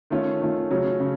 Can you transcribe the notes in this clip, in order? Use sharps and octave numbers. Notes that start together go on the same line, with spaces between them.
D#3 A3 C#4 F4
D#3 A3 C#4 F4
C#3 F#3 A3 C#4
C#3